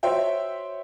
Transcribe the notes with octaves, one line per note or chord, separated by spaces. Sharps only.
F#4 C5 C#5 E5 G5